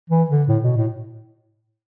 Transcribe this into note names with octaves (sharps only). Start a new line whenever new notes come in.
E3
D3
A2
B2
A2